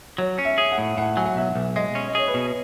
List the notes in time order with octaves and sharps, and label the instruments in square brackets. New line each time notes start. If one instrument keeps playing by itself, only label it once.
[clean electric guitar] F#3 [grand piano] C#5
[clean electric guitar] C#4
[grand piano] E5
[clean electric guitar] G#4
[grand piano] F#5
[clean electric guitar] A2
[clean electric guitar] A2 [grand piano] F#5
[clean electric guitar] F#3 [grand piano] G#5
[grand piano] F#5
[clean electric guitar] B1 [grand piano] E5
[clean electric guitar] B1
[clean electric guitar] G#3 [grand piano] D#5
[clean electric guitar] C#4
[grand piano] D#5
[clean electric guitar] G#4 [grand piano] C#5
[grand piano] B4
[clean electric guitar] B2